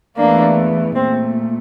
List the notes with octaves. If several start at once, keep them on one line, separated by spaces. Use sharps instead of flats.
E2 E3 A3 A#3 D4
A#2 A3 C4